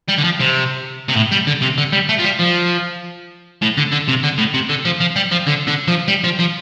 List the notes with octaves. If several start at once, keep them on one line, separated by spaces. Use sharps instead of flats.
G3
D3
F3
C3
C3
A2
G3
D3
C3
D3
G3
A3
F3
G3
F3
A2
D3
D3
C3
D3
A2
C3
D3
F3
F3
G3
F3
D3
D3
F3
G3
F3
F3